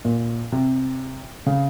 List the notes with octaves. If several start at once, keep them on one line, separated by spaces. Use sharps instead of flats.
A#2
C3
C#3